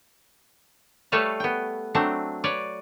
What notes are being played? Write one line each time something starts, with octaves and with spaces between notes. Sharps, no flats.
G3 A3 A4 B4 C#5 F5
B3 G5
F#3 A3 C4 D4
B4 C#5 D5